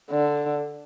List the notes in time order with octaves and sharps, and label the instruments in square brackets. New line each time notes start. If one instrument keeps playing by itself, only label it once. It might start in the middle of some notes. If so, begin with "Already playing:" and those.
[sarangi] D3